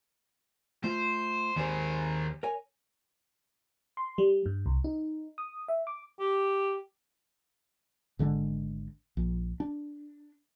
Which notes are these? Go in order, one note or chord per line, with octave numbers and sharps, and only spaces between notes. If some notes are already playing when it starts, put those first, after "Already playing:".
A3 F4 C5
D#2 D#3 G#4 C5
A#4 C#5 G#5
C6
G3
G2
C2
D#4
D#6
E5
D6
G4
G#1 D3 G#3 D4
A#1
D4